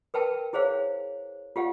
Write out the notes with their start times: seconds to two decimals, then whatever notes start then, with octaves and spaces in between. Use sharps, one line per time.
0.14 A#4 B4 G5 A5
0.53 E4 G#4 C5 C#5 F5
1.56 F4 G4 F5 F#5